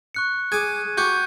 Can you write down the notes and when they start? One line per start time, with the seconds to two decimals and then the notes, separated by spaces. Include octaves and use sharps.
0.15 C#6 F#6 C#7
0.52 G#4 D6 G#6 D#7
0.97 F#4 G4 C#6 G6 C#7